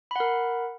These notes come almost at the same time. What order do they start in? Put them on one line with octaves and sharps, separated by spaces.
B5 F#5 A#4